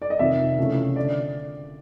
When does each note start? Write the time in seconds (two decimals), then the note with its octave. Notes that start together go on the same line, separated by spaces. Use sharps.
0.02 D5
0.10 D#5
0.19 F1 F2 C3 D#3 E5
0.58 C#2 C3 E3 A3 C#4
0.96 D3 D5